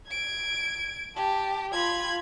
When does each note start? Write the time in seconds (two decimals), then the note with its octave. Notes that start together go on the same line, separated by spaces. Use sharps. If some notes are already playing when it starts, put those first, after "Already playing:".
0.10 G#6 D7
1.16 G4 A5
1.73 F4 B5 G#6